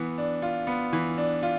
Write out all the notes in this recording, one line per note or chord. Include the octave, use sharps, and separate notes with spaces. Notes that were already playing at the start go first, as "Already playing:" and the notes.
Already playing: E3 B3
D4
F4
B3
E3
D4
F4